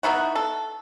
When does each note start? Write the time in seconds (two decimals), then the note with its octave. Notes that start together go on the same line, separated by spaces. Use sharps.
0.03 B3 D#4 E4 F#4
0.35 A4